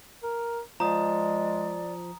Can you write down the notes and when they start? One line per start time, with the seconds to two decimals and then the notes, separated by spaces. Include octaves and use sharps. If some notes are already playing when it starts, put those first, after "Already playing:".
0.23 A#4
0.80 F3 G#3 D5 A#5 D#6